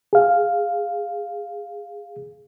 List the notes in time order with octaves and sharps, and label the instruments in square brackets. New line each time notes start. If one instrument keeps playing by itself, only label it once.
[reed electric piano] G#4 F5